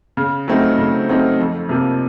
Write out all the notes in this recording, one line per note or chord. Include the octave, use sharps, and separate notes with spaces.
C#3
F#3 A3 C4 D#4
C#3
F#3 A3 C4 D#4
F2
C3 F3 A#3